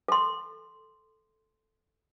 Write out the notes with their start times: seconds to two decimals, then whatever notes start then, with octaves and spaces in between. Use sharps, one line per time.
0.08 A4 C6